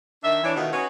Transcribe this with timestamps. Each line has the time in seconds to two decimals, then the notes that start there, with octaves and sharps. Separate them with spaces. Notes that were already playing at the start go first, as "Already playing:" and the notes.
0.24 D#3 D4 D#4 E5
0.44 E3 D4 C#5
0.56 B2 D#3 A3 B3 D#4 F4
0.72 C#4 D#4 F#4 G#4 B4